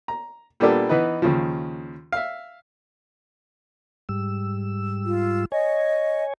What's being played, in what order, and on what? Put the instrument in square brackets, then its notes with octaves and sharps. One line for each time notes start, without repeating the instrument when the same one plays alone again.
[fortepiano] A#5
A#2 G3 A#3 B3 D4 A4
E3 B3 D#4 B4
D#2 C#3 F3
E5 F5
[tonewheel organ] G#2 G3 E6
[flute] F4
[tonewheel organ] C#5 G#5 [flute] D#5